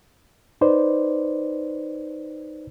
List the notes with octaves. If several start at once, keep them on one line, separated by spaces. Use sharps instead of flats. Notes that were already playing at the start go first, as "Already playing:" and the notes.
D#4 B4 C5 D5